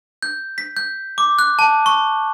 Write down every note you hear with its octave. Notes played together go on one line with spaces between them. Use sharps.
G6
B6
G6
D6
F#6
A5
C#6